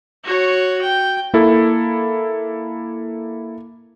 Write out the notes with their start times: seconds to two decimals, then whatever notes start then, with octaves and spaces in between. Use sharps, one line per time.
0.24 F#4 C#5
0.82 G5
1.34 A#3 E4 A4